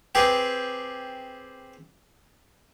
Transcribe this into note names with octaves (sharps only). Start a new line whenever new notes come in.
C4 G4 G#4 B4